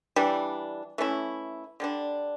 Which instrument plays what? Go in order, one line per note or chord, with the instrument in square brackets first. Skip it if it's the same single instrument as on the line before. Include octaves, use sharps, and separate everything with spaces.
[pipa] E3 G3 D4
E3 A3 C#4 E4
D3 G3 D4